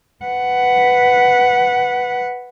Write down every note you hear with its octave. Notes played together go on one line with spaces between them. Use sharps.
B4 F#5